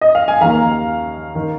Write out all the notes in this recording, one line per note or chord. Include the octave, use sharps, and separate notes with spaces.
D#5
F5
G#5
D#2 D#3 F5 A#5
D#3